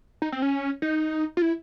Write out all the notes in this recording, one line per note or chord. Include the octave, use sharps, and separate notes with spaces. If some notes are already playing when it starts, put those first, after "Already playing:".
D#4
C4
C#4
D#4
F4
E4